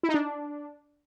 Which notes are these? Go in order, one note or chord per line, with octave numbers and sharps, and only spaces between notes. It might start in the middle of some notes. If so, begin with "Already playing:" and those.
E4
D#4
D4